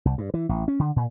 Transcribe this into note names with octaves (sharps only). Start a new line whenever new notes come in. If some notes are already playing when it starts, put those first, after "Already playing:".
C2
G2
E3
A1
C#4
D3
A#2